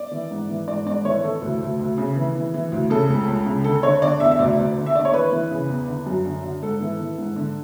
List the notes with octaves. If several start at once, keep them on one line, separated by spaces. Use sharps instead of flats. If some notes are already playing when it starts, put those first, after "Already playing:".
Already playing: D5
E3
G#2
E3
G#2 D5
G#2 D5
E3 C#5
E3 A4
D2
D2
D2
C#3
E3
E3
E3
D2
C#3 A4
C#2
C#2
C#3
D3 A4
D3 C#5
D3 D5
E2 E5
E5
D2 D5
D2
D3
E5
D3 D5
C#5
E3 B4
E3
C#3
E2
D3
F#2
D3
D3
G#2 A4
E3
E3
G#2
D3